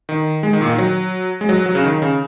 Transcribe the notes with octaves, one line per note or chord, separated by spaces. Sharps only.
D#3
G#3
D#3
A#2
D#3
F#3
G#3
F#3
F#3
C#3
D#3
C#3